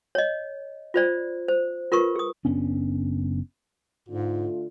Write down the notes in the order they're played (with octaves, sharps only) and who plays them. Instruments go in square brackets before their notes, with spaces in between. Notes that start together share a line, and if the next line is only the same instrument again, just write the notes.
[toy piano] C#5 D#5
F4 C5 D5
C5
F4 A#4 B4 C#6
G#4 D#6
[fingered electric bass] F#1 B3 C#4 D4
[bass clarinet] G#2 [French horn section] D3 A3 F4